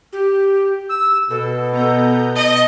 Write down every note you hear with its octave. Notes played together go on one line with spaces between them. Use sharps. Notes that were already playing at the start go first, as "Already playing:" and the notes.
G4
E6
B2 A4
B3 A#5 G6
D#5 A5 C#7